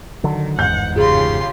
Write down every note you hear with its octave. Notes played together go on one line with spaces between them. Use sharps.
D3 D#3 F#3
G1 E2 G#2 F#5 G6
C#3 F4 G4 G#4 C6